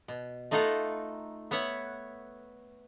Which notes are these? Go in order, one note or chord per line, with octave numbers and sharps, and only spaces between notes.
B2
A3 D#4 F4 A4 F#5 A#5
B3 C#5 E5 F#5